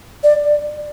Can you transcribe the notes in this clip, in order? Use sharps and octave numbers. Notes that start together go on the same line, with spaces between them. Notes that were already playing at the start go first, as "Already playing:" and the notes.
D5